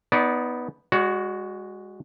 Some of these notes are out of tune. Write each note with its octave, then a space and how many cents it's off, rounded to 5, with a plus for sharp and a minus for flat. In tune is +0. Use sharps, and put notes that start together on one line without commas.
B3 +0 D#4 +20 D5 -20
G#3 -30 F#4 +0 C#5 +40